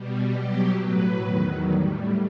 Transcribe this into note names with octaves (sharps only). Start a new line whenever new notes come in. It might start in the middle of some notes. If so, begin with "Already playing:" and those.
Already playing: B2 G3
B2 F#3 G4
A2 F#3 B4
E2 D#3 F#3
A2 G3